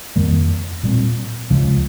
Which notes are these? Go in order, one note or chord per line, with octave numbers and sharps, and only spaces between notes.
F2 D#3 G3 A#3
A#2 G3 C4
C#2 C#3 F3 G#3